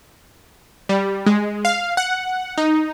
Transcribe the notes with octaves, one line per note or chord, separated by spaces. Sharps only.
G3
G#3
F5
F#5
D#4